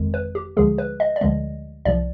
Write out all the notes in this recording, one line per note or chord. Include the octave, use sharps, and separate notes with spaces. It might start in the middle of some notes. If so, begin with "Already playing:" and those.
Already playing: G1 F2 D#3 G#3
B4
G4
D2 D3 F3 G#3 G#4
B4
D#5
D5
D2 D3 F3 G#3 D#5
C2 C3 F3 D5